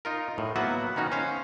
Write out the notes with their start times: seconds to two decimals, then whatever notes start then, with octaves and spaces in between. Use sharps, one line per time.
0.05 D#4 F4 A#4
0.38 A2
0.56 F#3 A#3 B3 F#4 E5 F#5
0.96 D#3 C#4 D#4 F#4
1.12 C#4 C5 F5